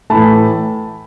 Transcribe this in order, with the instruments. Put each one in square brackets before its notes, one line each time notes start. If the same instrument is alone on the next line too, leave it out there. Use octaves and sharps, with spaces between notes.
[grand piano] A2 E3 A3 A5 B5